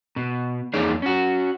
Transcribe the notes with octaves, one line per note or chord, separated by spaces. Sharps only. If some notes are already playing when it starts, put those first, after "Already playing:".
B2
E2 A#3 D#4 G#4 C#5 D5
C#4 F#4